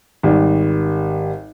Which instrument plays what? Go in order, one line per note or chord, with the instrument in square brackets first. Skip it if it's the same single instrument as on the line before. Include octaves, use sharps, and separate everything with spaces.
[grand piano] G#1 G3